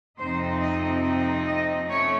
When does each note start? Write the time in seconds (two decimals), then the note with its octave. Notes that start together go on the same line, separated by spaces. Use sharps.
0.19 F2 C3 F3 C4 D#4 C5
0.61 D#5
1.45 D#5
1.88 A3 C#4 C#5